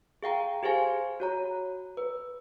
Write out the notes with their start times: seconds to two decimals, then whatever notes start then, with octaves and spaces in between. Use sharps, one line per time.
0.23 G#4 F5 G5 A#5
0.63 G4 G#4 C5 F5 G#5
1.20 F#4 C#5 A#5
1.97 B4